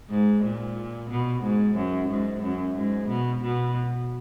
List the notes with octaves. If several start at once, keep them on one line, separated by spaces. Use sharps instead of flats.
G#2
A#2
B2
G#2
F#2
G#2
F#2
G#2
B2
B2